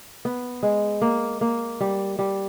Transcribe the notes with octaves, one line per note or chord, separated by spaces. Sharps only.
B3
G#3
A#3
A#3
G3
G3